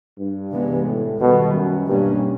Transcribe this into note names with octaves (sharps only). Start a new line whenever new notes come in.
G2
C3 E3 G#3 B3
A2
B2 D#3 G3 B3
F#2
G2 B2 G3 A#3 C#4